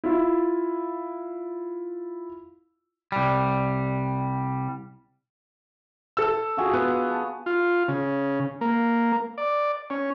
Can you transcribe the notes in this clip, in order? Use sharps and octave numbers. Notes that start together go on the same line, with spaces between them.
E4 F4
C2 G3
A4 E6
F4 F#4 G#4
B3
A5
F4
C#3
A#3
D5
C#4